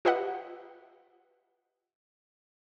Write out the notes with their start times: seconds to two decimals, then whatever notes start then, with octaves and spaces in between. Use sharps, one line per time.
0.05 F4 G4 B4 D#5 E5 F#5